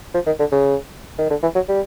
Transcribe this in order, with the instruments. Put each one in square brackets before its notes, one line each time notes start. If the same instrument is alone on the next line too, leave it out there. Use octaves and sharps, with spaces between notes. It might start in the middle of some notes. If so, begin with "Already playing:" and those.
[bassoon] F3
D#3
D3
C#3
D#3
D3
E3
F#3
G3